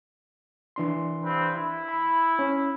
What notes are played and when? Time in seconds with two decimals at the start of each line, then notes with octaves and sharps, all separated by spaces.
0.76 E3 D4 C6
1.22 G2 C4 B4
1.55 E4
1.89 B5
2.39 C#4